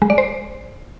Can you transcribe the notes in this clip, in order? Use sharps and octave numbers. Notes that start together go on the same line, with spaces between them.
G#3
D5
C5